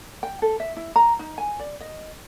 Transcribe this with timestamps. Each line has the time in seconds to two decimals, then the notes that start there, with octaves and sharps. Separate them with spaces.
0.23 G5
0.42 A4
0.60 E5
0.77 E4
0.96 A#5
1.19 D#4
1.38 G#5
1.60 D5
1.81 D#5